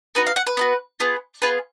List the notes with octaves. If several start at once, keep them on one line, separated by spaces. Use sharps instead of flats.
B3 D#4 F#4 B4
F5
F#5
B4
B3 D#4 F#4
B3 F4 G#4
B3 F4 G#4 B4